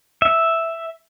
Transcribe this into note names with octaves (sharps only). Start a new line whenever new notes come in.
E5